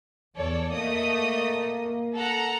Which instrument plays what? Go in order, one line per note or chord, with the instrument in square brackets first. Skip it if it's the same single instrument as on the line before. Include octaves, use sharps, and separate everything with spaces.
[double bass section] E2 [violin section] A4 C#5 D5
[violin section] A3 D#5 D#6 [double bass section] A#3
[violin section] A4 F#5 A#5